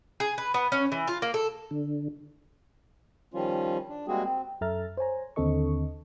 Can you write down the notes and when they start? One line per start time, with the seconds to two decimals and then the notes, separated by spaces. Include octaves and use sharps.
0.20 G#4
0.38 B4
0.54 B3
0.72 C#4
0.92 E3
1.08 F4
1.22 A#3
1.34 A4
1.71 D3
3.34 D#3 F3 G3 C#4 F4
3.89 D4
4.08 G3 G#3 A#3 C4 F#4 G#4
4.24 C4
4.61 F#2 A4 E5 A#5 F6 A6
4.97 C5 C#5 G#5 A#5
5.36 D#2 D3 C4 A4 D#5 C#6